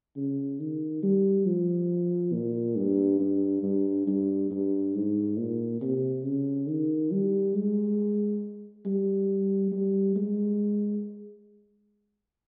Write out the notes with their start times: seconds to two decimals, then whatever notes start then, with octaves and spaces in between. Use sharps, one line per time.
0.17 C#3
0.60 D#3
1.03 G3
1.46 F3
2.33 A#2
2.77 G2
3.20 G2
3.63 G2
4.07 G2
4.50 G2
4.95 G#2
5.38 A#2
5.81 C3
6.25 C#3
6.68 D#3
7.12 G3
7.55 G#3
8.86 G3
9.72 G3
10.16 G#3